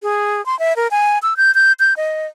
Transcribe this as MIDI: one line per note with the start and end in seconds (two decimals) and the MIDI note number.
0.03 0.44 68
0.46 0.58 84
0.59 0.76 76
0.76 0.88 70
0.91 1.18 80
1.23 1.37 88
1.37 1.54 91
1.55 1.72 91
1.80 1.94 91
1.97 2.27 75